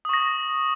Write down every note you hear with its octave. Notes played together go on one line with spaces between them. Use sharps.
C#6 D#6 A#6